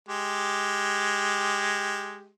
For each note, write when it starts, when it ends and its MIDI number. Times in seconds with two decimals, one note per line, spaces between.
0.09 2.29 56
0.09 2.29 67